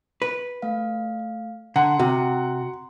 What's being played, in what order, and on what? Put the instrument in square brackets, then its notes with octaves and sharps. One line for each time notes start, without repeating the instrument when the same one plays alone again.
[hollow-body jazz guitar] B4
[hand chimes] A3 F5
[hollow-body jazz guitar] D3 [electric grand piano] F#5 [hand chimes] A#5 C6
[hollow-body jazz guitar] C3 [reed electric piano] F#4